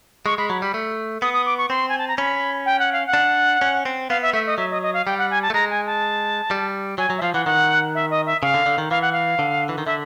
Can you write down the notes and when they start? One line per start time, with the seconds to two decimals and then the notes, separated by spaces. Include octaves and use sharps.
0.26 G#3 C#6
0.38 G#3 B5
0.50 F#3 B5
0.62 G3 B5
0.74 A3
1.22 B3 D#6
1.33 D#6
1.46 D6
1.58 C#6
1.70 C4 C6
1.89 G#5
1.98 A5
2.08 A#5
2.18 C#4 B5
2.66 G5
2.79 F#5
2.93 F5
3.07 F#5
3.14 D4
3.61 C#4
3.85 C4
4.10 B3 F5
4.22 E5
4.33 A3 E5
4.46 D#5
4.58 F#3 E5
4.71 D#5
4.82 D#5
4.94 F5
5.06 G3 G5
5.18 F#5
5.31 G#5
5.42 A5
5.50 A3
5.54 G#3 A#5
5.70 G#5
5.86 A5
6.51 G3
6.98 F#3 G#5
7.10 F#3
7.18 E5
7.22 F3 F5
7.34 E3 F#5
7.46 D#3 F#5
7.95 E5
8.10 D#5
8.26 E5
8.43 C#3 F5
8.54 D3
8.66 D3
8.78 D#3
8.91 E3 F5
9.02 F#5
9.13 F5
9.39 D3
9.69 E3
9.78 D#3
9.86 D3 E5